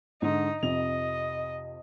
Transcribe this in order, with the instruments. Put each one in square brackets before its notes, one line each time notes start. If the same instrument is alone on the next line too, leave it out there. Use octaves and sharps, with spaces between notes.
[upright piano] G#2 D3 [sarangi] D#4
[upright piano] F2 C3 F7 [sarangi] D#5